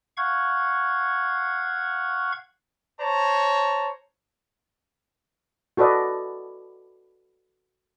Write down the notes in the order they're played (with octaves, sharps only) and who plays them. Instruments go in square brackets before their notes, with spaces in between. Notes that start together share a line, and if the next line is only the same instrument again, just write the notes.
[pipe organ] F5 F#5 C#6 G#6
[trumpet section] C5 C#5 A5 A#5
[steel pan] F#4 A4 B4 D5 D#5